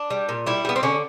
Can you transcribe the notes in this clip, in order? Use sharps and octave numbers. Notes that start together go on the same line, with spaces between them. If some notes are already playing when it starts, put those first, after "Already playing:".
Already playing: D4
G3
A#2
G3 E4
G3 B3
C4
D3 C#4